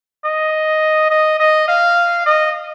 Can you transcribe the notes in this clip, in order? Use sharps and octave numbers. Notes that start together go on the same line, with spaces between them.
D#5
D#5
D#5
F5
D#5